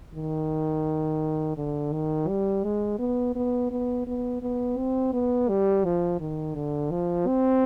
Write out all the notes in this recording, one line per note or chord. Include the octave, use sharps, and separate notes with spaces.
D#3
D3
D#3
G3
G#3
B3
B3
B3
B3
B3
C4
B3
G3
F3
D#3
D3
F3
C4